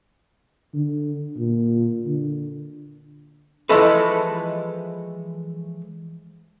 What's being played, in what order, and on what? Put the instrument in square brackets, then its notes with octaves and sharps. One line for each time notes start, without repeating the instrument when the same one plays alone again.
[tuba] D3
A#2
D3
[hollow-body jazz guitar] E3 F3 G#3 A3 A4 B4